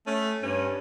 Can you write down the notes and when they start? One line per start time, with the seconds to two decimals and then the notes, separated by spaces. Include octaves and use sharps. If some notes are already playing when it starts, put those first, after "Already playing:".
0.07 A3 C#4
0.43 G2 C#4